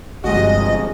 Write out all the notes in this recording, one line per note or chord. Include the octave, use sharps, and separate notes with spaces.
G1 C3 F3 G3 G#3 F#4 D#5